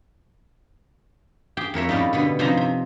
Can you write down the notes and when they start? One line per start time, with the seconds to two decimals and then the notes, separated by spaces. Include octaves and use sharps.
1.57 G4 G#4 G5
1.74 F2 A#4 C#5 E5
1.89 A2 G3 A#3 C#4 D#4
2.13 B2 D3 B3
2.39 C3 F3 C#4 D#4 C5 A#5
2.57 C3